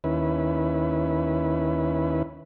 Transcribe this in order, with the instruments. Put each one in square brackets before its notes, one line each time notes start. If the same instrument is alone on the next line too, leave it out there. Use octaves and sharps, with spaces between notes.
[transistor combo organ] D#2 C#4 E4 B4